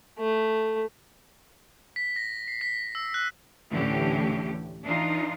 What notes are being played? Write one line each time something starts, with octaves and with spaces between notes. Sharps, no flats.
A3
B6
A#6
C7
B6
E6
F#6
D2 A2 D3 E3 C#4 G4
E3 D4 D#4 F4